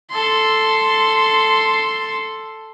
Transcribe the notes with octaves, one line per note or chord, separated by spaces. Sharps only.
A4 C6